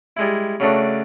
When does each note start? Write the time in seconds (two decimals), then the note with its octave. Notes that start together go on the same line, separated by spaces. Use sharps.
0.17 G3 G#3 E4
0.60 C#3 F#3 A3 D4